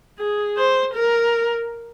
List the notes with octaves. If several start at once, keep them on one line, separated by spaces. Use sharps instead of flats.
G#4
C5
A#4